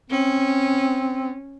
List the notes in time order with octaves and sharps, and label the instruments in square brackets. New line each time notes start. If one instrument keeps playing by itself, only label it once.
[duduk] C4 [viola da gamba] C#4